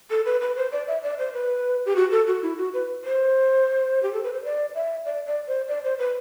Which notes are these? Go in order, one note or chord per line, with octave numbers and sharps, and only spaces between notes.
A4
B4
B4
C5
D5
E5
D5
C5
B4
G4
F#4
A4
F#4
E4
F#4
B4
C5
G4
A4
B4
C5
D5
E5
D5
D5
C5
D5
C5
B4